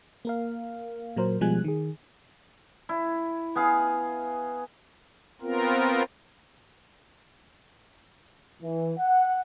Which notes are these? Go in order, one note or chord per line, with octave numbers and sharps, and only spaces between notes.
A#3 A#4 F5
A#2 F#3 A#4 C5
B2 F3 G3 G#3 G#5 F#6
D#3 G#4
E4
B3 G#4 F5
B3 C4 F4 A#4
E3
F#5